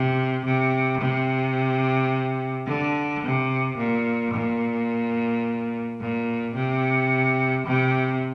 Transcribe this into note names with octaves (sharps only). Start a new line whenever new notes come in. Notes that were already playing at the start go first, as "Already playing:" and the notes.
Already playing: C3
C3
C3
D3
C3
A#2
A#2
A#2
C3
C3